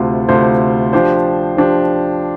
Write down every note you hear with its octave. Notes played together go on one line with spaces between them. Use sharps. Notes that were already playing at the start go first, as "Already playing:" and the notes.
Already playing: D2 C3 A3 F4 C5
D2 C3 A3 F4 C5
F3 D4 G4 C5
F3 D4 G4 C5